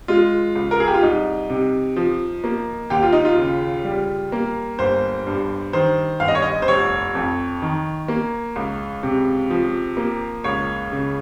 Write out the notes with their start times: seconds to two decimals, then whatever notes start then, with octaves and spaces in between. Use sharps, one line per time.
0.08 G#3 F4
0.55 C#2
0.71 A#4
0.80 G#4
0.87 G4
0.94 F4
1.02 C2 D#4
1.50 C3
1.96 F3
2.44 A#3
2.90 D#2 G4
3.03 F4
3.13 D#4
3.25 F4
3.38 C#3
3.85 G3
4.32 A#3
4.79 G1 C5
5.27 G2
5.73 D#3 C5
6.20 G1 F5
6.28 D#5
6.35 C#5
6.42 D#5
6.62 C5
6.68 F1 C#5
7.15 F2
7.62 D#3
8.08 A#3
8.56 C#2
9.03 C3
9.50 F3
9.97 A#3
10.44 C#2 C#5
10.92 C#3